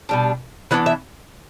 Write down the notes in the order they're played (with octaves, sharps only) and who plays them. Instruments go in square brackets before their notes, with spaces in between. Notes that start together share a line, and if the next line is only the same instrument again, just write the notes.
[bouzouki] B2 G3 D4
E3 B3 D4 F#5
E5